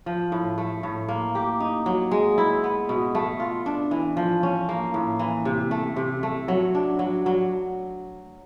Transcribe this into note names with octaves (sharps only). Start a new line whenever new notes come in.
F3
A2
A3
A2
A#3
G4
D#4
F#3
G#3
E4
B3
B2
A3
F4
D4
E3
F3
C#4
A#3
A2
E3
C3
A3
C3
A3
F#3
D4
F#3
F#3